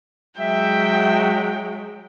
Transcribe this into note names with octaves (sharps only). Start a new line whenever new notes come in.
F#3 G#3 E5 G5